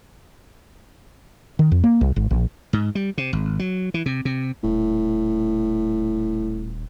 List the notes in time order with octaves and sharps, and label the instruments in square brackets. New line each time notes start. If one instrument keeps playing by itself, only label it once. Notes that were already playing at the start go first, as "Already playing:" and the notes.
[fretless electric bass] D#3
F2
A#3
C2
G#1
A#1
[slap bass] G#2
G3
C3
G#1
F#3
E3
C3
C3
[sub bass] D#1 [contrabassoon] A2